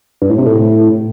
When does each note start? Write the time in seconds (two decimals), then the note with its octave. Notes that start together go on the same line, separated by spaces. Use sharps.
0.22 G2
0.30 A2
0.38 C3
0.46 A2